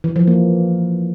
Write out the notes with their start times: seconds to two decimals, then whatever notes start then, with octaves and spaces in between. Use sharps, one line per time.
0.04 E3
0.16 F3
0.27 A#3